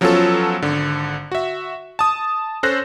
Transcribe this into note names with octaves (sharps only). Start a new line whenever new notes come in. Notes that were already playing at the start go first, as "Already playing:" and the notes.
F3 F#3 B3 C#4 F4 A4
G#1 D3
F#4 E5
A5 D#6
C#4 A4 C5 F#6 A#6